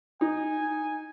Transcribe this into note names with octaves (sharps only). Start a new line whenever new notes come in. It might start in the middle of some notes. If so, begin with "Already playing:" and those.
D#4 G#5